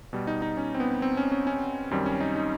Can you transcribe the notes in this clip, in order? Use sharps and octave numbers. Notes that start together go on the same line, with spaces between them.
B2 G3
D#4
D#4
C#4
C4
B3
C4
C#4
C#4
C#4
F#2 D#3 G3 C4
C#4
D#4
D#4